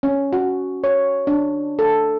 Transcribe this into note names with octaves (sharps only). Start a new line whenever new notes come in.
C#4
F#4
C#5
D4
A4